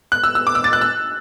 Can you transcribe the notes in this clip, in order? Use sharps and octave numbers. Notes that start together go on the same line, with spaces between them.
F#6
E6
E6
D6
E6
A6
F#6
E6